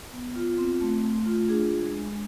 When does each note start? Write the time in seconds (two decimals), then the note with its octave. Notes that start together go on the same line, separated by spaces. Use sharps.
0.12 B3
0.35 F4
0.58 C4
0.81 A3
1.03 A3
1.26 F4
1.49 D4 G#4
1.72 G#3
1.94 G#3